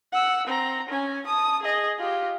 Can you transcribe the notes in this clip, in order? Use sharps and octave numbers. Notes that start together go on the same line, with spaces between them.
F#5 E6
C4 A#5
C#4 G#5
A5 D#6
G#4 D#5
F4 G4